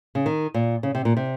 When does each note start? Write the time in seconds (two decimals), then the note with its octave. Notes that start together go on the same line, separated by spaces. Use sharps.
0.15 C#3
0.26 D#3
0.54 A#2
0.83 C#3
0.95 C3
1.05 A#2
1.17 C3